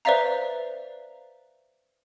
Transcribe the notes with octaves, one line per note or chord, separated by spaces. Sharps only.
B4 C5 D5 E5 F5 A#5